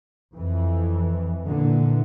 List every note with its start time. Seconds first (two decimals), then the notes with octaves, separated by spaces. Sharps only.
0.35 F2 E3
1.46 A#2 D3 E3